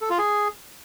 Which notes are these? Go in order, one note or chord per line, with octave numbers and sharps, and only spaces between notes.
A4
F4
G#4